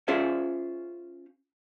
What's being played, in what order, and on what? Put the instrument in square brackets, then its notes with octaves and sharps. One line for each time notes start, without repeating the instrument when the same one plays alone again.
[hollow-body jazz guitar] C#4 F4 G#4 C5 E5